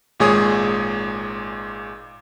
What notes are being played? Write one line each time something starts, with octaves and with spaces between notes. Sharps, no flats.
G#1 A#2 G#3 G#4 C#5 D#6